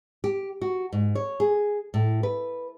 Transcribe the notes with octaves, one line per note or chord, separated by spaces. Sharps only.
G4
F#4
G#2
C#5
G#4
A2
B4